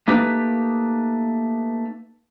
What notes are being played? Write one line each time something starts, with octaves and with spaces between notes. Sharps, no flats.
A3 A#3 D#4 G4 B4